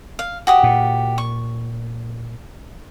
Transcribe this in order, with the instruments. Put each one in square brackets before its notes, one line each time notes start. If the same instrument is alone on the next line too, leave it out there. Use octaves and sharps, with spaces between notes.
[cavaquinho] F5
F#4 G4 D#6
[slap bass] A#2
[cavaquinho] C#6